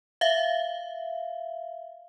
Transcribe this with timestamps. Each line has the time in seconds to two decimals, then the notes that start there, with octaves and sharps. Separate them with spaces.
0.21 E5 F5